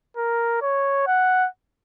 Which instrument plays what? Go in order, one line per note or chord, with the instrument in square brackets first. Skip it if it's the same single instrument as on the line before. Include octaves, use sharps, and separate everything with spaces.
[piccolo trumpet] A#4
C#5
F#5